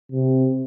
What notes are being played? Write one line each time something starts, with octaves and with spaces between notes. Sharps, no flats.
C3